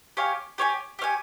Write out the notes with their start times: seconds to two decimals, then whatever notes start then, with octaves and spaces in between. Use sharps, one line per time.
0.17 G4 C#5 F5 G#5
0.58 G4 C#5 F5 G#5
0.99 G4 C#5 F5 G#5